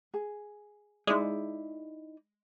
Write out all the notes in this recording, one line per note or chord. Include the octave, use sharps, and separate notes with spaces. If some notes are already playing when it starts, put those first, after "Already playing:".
G#4
G#3 D#4 E4 D5